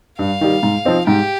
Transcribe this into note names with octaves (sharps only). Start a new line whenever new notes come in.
G2 F5
D#3 G3
G#2
F3 C4 D#4
G#2 G4